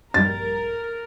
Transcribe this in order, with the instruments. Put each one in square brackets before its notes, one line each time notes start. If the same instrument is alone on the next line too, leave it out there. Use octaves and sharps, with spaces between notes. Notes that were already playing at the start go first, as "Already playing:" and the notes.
[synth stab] A#1 G2 G3 [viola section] A#4 [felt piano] A6